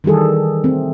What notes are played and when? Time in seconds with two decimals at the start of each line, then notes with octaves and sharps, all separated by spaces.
0.04 D#3 E3 G3 G#4 A4
0.64 A3 C4